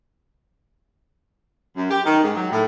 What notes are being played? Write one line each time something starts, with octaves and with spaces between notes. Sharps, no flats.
F#2
G4
D#3
G#2
F#3
A2